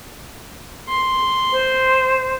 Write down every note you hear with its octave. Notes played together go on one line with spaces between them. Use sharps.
C6
C5